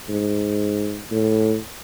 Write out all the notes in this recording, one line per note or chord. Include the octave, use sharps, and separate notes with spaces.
G#2
A2